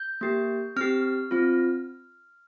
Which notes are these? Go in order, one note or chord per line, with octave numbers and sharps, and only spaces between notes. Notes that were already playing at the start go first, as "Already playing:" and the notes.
Already playing: G6
A#3 G4
C4 G4 F6
C4 F4